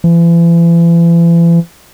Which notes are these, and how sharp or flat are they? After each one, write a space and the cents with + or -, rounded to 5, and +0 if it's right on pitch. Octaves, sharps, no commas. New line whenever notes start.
E3 +40